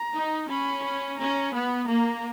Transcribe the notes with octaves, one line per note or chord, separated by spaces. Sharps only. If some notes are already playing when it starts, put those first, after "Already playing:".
Already playing: A#5
D#4
C#4 B5
B5
C#4 A#5
B3 B5
A#3 A#5